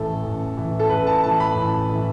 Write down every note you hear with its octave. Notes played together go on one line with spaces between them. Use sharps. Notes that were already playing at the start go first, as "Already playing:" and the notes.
Already playing: A1 A2 E3 A4
A1
A2 E3
A4
A1 B4
A5
A2 E3 A5
B5
A1
A2 E3